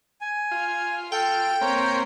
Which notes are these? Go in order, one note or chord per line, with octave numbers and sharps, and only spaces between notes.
G#5
F4
A4 G5
A#3 C4 C#5